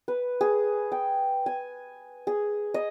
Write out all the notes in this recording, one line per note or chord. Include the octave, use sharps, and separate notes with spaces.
B4
G#4
G5
G#5
G#4
D#5